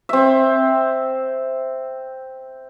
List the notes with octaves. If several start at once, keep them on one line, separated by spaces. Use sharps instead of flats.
C4 E5